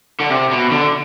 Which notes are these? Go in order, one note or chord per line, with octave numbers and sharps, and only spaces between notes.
D3
C3
B2
D3